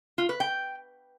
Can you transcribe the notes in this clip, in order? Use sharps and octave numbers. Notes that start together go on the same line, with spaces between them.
F4
B4
G5